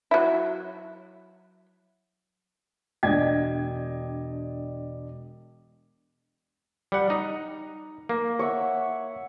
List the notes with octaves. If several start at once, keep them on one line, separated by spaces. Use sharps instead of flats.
F#3 E4
E1 D4 D#5 G5 G#6
G3 F#5
D#4
A#3
C#5 E5 F#5